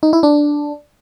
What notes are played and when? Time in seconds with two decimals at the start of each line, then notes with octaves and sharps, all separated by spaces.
0.03 D#4
0.13 E4
0.23 D4